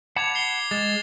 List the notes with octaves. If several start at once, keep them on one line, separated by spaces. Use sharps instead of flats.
F#5 A5 B5 D6 G#6 F7
C7 G7
G#3 A6 E7